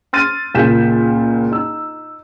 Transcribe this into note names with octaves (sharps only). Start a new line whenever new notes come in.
C6 F6 A6 D#7
C#2 A#2 G6 B6 E7
D#4 E6